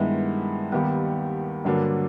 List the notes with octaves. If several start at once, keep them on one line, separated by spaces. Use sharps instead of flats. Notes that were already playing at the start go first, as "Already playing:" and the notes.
Already playing: G2 D#3 G#3 B3 E4
D#2 D#3 G3 B3
G2 D3 F#3 A#3 D4